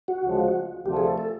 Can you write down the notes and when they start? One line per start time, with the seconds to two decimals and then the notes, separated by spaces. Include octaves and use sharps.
0.08 F#4
0.24 D2 C#3 F3 G#3
0.86 D2 C3 F3 A3 G4
0.97 G#4
1.07 A4
1.18 A4